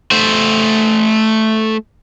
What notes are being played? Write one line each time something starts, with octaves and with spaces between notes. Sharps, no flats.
A3 C5